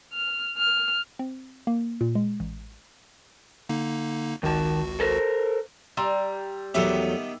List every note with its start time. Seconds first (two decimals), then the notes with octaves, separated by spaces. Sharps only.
0.13 F6
0.58 F6
1.19 C4
1.67 A#3
2.01 A#2
2.15 G#3
2.40 A1
3.69 D3 A#3 D#4
4.43 G#1 C#2 D#3 F#4 A5
5.00 A4 A#4 C5
5.97 G3 A#5 C6 E6
6.74 E2 D#3 F#3 A3 B3 G4 E5 E6